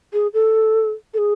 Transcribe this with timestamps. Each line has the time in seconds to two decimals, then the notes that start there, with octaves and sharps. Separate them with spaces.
0.13 G#4
0.34 A4
1.14 A4
1.18 G#4